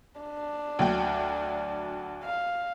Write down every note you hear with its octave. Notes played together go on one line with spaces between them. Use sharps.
D4
D2 F#3 G5
F5